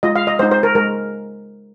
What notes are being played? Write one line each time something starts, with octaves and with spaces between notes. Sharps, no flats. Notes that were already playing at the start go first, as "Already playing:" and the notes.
G#3 F4 D#5
F5
D#5
G#3 D#4 C5
C5
A#4
G#3 A#4